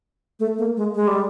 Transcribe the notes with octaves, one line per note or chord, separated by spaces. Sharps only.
A3
A#3
G#3
G#3
G3